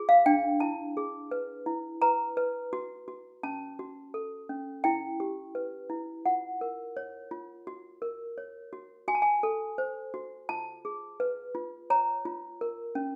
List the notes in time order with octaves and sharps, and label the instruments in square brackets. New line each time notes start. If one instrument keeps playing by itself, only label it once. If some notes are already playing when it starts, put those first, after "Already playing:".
Already playing: [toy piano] F4 G#4
F5
D4 G5
E4 A5
G#4
B4
E4
B4 A#5
B4
F#4
F#4
C#4 A5
F#4
A4
C#4
E4 G5
G4
B4
E4
F4 F#5
A#4
C#5
F4
F#4
A#4
C#5
F#4
F#4 G#5
A5
G#5
A4
C5
F#4
F4 A5
G#4
B4
F4
C#5 A#5
F4
A#4
C#4